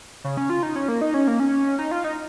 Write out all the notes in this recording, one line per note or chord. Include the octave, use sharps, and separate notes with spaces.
C#3
C#4
F4
D#4
C#4
A#3
D#4
C#4
A#3
C#4
D#4
F4
D#4